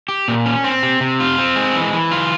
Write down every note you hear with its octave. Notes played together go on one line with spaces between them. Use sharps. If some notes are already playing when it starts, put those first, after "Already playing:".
G4
A#2
C#4
C4
C3
C3
F4
C4
G#3
E3
E3
F4